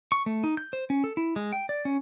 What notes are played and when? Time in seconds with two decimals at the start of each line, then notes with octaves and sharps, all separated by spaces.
0.12 C#6
0.26 A3
0.44 D#4
0.57 G6
0.73 C5
0.90 C#4
1.04 A4
1.17 E4
1.36 G#3
1.52 G5
1.69 D5
1.85 C#4